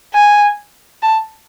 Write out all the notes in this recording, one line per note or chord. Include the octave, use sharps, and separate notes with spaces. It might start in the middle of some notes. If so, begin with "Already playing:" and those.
G#5
A5